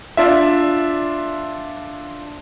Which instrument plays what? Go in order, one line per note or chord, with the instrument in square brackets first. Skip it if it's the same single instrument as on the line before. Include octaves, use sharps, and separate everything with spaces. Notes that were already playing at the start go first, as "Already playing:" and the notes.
[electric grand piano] D4 F4 E5